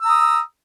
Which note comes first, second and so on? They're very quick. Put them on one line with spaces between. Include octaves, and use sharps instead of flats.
E6 A#5 D#6